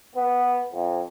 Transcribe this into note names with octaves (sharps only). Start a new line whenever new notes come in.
B3
F2